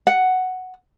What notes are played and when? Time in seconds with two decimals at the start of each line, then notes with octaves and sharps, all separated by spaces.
0.07 F#5